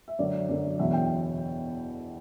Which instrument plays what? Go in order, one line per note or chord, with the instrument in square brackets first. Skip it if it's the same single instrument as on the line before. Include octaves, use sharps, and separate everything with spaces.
[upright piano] E5
F#2 D3 F#3 D5
F#2 D3 F#3
E2 B2 F#3 E5
G5